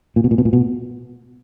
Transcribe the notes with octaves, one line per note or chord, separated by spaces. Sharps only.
A#2
B2
A#2
B2
A#2
B2